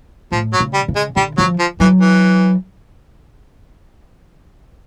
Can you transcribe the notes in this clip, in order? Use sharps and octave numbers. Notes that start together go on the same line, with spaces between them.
A2 F3
F#3
C#3
G3
C#3
G#3
D3 G3
F3 F#3
F3
E3 F#3
E3